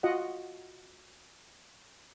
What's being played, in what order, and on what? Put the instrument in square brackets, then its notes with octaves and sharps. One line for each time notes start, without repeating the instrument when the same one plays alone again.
[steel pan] F4 F#4 D#5 F#5